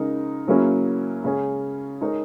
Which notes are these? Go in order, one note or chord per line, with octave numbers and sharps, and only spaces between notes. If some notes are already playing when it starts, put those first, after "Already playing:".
Already playing: C#3 G#3 D#4 A#4
C#3 F#3 A#3 C#4 E4
C#3 G#3 C#4 G#4
G#3 D#4 A#4 C#5